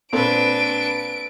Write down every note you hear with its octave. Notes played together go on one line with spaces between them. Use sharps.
A#2 C4 D4 A4 B4 D7